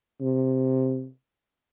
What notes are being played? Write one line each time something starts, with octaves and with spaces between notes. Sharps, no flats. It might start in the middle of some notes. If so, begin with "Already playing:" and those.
C3